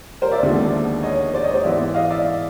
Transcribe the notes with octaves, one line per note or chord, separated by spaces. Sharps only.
A#4 C5
D5 E5
D#2 D3 F3 G#3 B3
C#5 D#5
C5 D5
C#5 D#5
C5 D5
G#2 E3 G#3 B3 D5 E5
D#5 F5
D5 E5